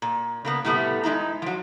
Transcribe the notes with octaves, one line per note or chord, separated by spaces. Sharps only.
A#2
C#3 A#3 B3
A2 C3 G3 A3 B3
G#3 D#4 E4 A#5
F3 F#3